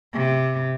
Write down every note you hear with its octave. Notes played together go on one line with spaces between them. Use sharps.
C3